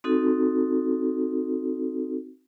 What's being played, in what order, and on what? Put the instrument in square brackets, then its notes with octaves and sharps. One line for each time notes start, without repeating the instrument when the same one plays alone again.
[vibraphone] C4 D#4 F#4 A4